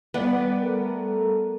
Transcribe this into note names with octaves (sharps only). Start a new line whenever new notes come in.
G3 B3 B4 D5 F#5
A3 A4 A#4